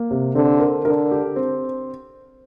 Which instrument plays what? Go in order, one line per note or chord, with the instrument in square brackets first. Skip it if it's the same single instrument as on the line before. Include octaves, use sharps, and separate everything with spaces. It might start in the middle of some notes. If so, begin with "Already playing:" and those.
Already playing: [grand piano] A#3
C3
[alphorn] D3 [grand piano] C4
[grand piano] A#4
[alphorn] D3 [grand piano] A#4
[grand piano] G4
C4